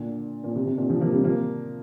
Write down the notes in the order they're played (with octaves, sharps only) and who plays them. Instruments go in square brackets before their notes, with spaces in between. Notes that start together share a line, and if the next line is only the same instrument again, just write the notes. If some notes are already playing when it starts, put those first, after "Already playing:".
Already playing: [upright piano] A#2 D3
A#2
C3
C3
A#2 D3
C3 F3
F3 A#3
G3 C4
F3 A#3